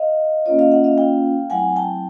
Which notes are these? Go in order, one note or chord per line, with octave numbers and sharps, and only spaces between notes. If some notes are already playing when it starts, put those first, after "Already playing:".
Already playing: D#5 F5
A#3 C#4 F4 C#5 D#5
D#5 F5
E5 F#5
D#5 F5
F5 G5
F#3 A3 C4 E4 F#5 G#5
G5 A5